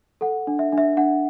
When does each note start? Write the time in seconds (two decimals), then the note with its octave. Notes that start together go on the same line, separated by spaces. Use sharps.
0.21 A4 F#5
0.47 D4
0.59 E5
0.72 D4
0.78 E5
0.97 D4 F#5